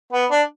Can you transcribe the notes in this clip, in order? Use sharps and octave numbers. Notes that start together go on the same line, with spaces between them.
B3
D4